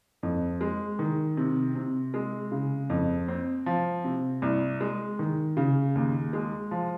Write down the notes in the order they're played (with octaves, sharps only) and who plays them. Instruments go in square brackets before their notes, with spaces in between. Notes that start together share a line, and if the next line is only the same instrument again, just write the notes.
[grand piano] F2
G#3
D#3
C3
C3
G#3
C#3
F2
C4
F3
C3
C2
G#3
D#3
C#3
D#2
G#3
F3